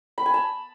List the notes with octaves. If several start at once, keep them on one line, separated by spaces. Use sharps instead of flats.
B5
G#5
A5